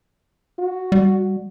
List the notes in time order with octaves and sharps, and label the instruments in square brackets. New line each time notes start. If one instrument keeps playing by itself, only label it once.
[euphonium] F#4
[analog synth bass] G3